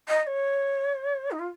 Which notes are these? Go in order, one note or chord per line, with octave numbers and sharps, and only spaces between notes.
D#5
D#5
C#5
D#4
F4